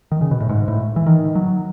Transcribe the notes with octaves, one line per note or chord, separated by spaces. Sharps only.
D#3
C#3
B2
A2
G#2
A2
E3
D#3
F#3